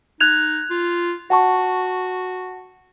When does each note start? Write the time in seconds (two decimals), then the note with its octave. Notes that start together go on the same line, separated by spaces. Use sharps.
0.20 D#4 F#6 G#6 F7
0.70 F4
1.30 F#4 F#5 A5 C#6